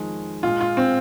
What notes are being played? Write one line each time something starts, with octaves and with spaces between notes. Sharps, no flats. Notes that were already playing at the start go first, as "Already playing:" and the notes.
Already playing: F2 D#3 G#3
A#2 G#3 F4
F4
C4